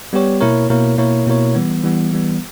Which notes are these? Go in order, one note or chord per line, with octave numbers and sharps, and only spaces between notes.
G3 B3 G4 C#5
B2 A#3 E4 A#4 C#5
B2 A#3 E4 A#4 C#5
B2 A#3 E4 A#4 C#5
B2 A#3 E4 A#4 C#5
E3 G3 B3
E3 G3 B3
E3 G3 B3